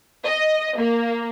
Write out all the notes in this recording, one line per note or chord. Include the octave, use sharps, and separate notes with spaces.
D#5
A#3